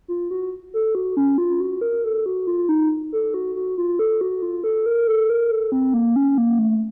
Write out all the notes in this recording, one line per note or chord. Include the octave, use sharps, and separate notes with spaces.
F4
F#4
A4
F#4
C#4
F4
F#4
A#4
A4
F#4
F4
D#4
A4
F#4
F#4
F4
A4
F#4
F4
A4
A#4
A4
A#4
A4
C4
A#3
C#4
A#3
A3